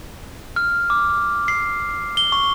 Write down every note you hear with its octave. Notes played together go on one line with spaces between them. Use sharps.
F6
D6
C7
G7
C#6